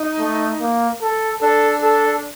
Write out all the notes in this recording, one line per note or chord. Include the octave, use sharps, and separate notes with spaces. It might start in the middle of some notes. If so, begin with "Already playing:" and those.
Already playing: D#4
A3
A#3
A4
D4 A4
A4